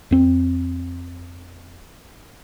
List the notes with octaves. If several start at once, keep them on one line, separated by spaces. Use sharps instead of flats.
F2 C4